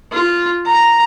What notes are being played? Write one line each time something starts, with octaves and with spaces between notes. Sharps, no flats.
F4
A#5